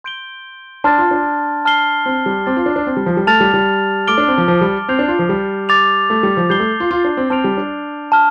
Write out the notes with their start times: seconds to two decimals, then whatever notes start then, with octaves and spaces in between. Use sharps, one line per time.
0.04 C6 G6 D7 G7
0.84 D4 A5 C6 F6 A6
0.98 F4
1.11 D4
1.65 A5 F6 C7 G7
2.06 C4
2.26 G3
2.46 C4 A5 D6 A6
2.57 F4
2.66 D4
2.76 D4
2.87 C4
2.97 G3
3.06 F3
3.17 G3
3.27 A3 A5 F6 A6 F7
3.40 G3
3.54 G3
4.07 A3 D6 F6 D7 G7
4.18 D4
4.28 C4
4.38 F3
4.48 F3
4.61 G3
4.88 C4 G6 C7 F7
4.99 D4
5.08 F4
5.19 F3
5.29 G3
5.69 D6 A6 F7
6.10 A3
6.23 G3
6.37 F3
6.50 G3 G6 C7 G7
6.60 A3
6.80 F4
6.91 F4
7.04 D4
7.17 C4
7.30 C4 A5 F6 D7 F7
7.44 G3
7.57 D4
8.12 A5 F6